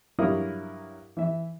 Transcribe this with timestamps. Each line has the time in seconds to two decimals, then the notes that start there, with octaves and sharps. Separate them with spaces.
0.19 G2 F#3 E4 A#4 F5 D#6
1.17 E3 E5